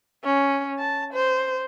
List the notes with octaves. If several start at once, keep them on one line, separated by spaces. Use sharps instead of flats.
C#4
A5
C5